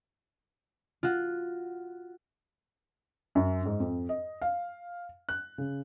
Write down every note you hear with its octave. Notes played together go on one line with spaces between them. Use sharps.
F4 F#4
F#2
G#2
F2
D#5
F5
F#6
C#3